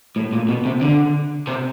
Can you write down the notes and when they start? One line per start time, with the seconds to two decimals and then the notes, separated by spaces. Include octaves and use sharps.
0.16 A2
0.33 A#2
0.49 B2
0.65 C3
0.81 D3
1.47 C3